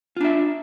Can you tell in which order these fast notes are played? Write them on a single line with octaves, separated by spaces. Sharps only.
F4 D4 E5